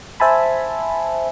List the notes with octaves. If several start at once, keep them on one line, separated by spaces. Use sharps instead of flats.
C5 E5 G#5 A5 B5